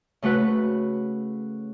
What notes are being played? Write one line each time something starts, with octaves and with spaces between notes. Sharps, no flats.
C#3 A3 F#4 B4